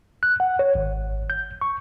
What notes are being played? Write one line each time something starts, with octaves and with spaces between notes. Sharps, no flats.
F#6
F#5
C#5
G#1
G6
C#6